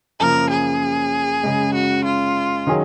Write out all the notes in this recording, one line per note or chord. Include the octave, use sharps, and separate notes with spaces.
F#2 C#3 F3 A#3 A#4
G#4
F#2 C#3 G#3
F#4
F4
D#3 F#3 C#4 G#4